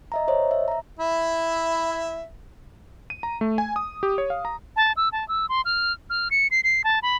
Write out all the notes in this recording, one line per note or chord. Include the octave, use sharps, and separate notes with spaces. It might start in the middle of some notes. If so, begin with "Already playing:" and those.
D#5 E5 A#5
C5 C#5 D#5
E5
E5 A#5
E4 E5
D#7
A#5
A3
G#5
D#6
G4
C#5
F5
A#5
A5
E6
A5
E6
C6
F6
F6
C#7
C7
C7
A5
B5